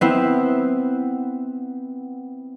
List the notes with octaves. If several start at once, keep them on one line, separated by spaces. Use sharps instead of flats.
B3 C4 E4